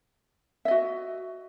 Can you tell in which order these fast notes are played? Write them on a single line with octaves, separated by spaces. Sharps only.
E5 D#5 F#4